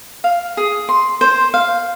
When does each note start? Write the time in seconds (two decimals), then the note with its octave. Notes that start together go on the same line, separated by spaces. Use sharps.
0.24 F5
0.57 G#4
0.89 C6
1.21 C5
1.54 F5